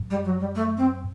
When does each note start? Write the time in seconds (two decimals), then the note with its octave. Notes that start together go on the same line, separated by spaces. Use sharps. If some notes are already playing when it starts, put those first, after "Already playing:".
Already playing: F#2
0.10 G3
0.25 F#3
0.40 G3
0.55 A3
0.77 C4